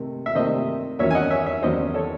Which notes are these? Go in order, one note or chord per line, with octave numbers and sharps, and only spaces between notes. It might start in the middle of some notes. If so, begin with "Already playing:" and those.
Already playing: C3 D#3 A3
E5
C3 D#3 A3 C5 D#5
E2 D#3 F#3 C#4 C#5 E5
G#5
D#5 F#5
C#5 E5
C#5 E5
E2 D#3 F#3 C#4 C5 D#5
A4 C#5